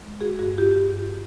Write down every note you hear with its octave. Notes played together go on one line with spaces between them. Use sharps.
G#3
F#4 G#4
G2 F#4 G#4
F4 G4
G2